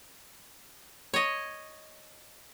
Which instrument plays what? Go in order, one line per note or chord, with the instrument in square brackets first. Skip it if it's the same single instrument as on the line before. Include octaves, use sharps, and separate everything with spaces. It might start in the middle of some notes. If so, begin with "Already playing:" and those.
[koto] C#5 D#5